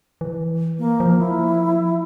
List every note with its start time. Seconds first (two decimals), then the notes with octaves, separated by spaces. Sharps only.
0.21 E3
0.79 A#3
1.00 F3
1.19 E4